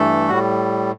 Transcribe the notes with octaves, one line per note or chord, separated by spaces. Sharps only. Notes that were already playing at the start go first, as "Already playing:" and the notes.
Already playing: G2 E3 A3 A4
A2 G3 F#4